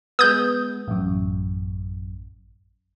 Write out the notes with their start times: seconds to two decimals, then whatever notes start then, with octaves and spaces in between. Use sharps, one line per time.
0.19 G#3 B3 D#6 G6
0.88 A1 F#2